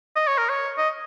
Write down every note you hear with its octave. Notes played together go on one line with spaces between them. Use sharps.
D#5
C#5
A#4
C#5
D#5